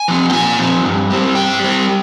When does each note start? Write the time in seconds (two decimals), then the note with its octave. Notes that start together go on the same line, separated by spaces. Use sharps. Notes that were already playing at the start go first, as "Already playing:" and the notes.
Already playing: G#5
0.08 F3 C4
0.30 G5
0.33 A#2 G#5
0.59 F3 C4
0.84 G2
1.10 G3 C4
1.35 G2 G5
1.60 G3 C4